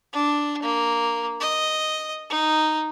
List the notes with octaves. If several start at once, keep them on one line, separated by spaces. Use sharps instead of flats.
D4
A#3
D#5
D#4